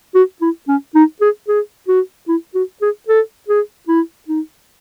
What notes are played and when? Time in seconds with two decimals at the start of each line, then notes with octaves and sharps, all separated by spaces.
0.15 F#4
0.42 E4
0.68 C#4
0.95 D#4
1.21 G#4
1.48 G#4
1.88 F#4
2.28 E4
2.55 F#4
2.82 G#4
3.08 A4
3.48 G#4
3.88 E4
4.28 D#4